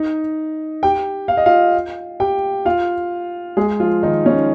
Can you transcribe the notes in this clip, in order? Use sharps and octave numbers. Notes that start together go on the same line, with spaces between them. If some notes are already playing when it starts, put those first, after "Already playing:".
Already playing: D#4 D#5
G4 G5
F5
D#5
F4 F5
G4 G5
F4 F5
G#3 G#4
F3 F4
D#3 D#4
C#4